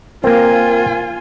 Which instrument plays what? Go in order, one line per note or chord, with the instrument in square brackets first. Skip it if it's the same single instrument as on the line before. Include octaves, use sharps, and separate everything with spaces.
[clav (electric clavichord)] A#3 C4 [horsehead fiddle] F4 G#5 [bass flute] A#4